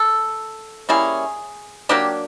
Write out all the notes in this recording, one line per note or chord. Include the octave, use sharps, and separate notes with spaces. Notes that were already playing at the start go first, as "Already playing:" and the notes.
Already playing: A4
G3 A#3 C#4 E4 G#4
F#3 A#3 D4 G4